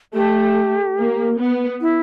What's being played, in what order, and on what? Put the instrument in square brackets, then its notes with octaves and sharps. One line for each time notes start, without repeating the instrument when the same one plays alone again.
[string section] A3 [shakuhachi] G4
[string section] A#3
B3
[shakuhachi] E4